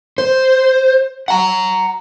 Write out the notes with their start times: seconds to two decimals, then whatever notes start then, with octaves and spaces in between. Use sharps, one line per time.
0.18 C5
1.28 F#5 A#5